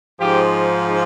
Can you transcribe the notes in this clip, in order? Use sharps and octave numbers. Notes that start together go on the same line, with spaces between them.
G#2 F3 G4